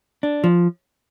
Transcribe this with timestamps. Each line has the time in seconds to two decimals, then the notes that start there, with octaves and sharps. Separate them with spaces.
0.23 D4
0.44 F3